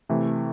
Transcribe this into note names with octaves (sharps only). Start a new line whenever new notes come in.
C3 E3 A3